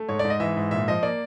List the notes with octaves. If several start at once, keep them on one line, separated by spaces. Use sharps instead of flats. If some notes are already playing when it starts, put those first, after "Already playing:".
Already playing: A3
G#2 C#5
D5
G#2
D#5
E3 E5
G#2
A#2 E5
F3 D#5
A#3 D5